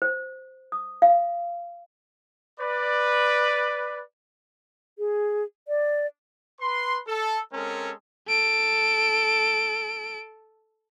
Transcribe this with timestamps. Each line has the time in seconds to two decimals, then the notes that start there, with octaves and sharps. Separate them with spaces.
0.02 C5
0.72 D#6
1.02 F5
2.60 B4 D5
4.98 G#4
5.68 D5
6.61 B4 C6
7.07 A4
7.53 G#3 C4 C#4 A4 A#4
8.28 A4 D7